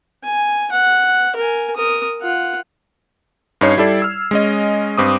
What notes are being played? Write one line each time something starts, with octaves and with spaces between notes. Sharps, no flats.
G#5
F#5
A#4 G#5
A#4 D#6
F4 F#5
G2 C#4 D#4 C#5 G#6 C7
G3 E4 A4 D5
E6 F6
G#3 C#4 D#5
G2 C4 D6 D#6